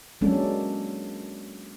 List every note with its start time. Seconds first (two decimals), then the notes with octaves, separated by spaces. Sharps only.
0.21 F#3 G#3 A#3 C#4 D4 A4